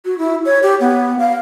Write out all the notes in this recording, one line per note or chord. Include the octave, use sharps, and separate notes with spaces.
F#4
E4
C#5
G4
B3
F5